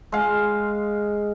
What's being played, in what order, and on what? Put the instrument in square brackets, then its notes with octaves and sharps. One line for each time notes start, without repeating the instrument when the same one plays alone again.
[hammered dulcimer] G#3 F5